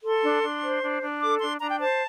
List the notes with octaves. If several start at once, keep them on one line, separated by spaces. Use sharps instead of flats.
A4 C6
D4
D4
C5
D4
D4
A4 D6
D4 C6
D4 A#5
G5
C5 A5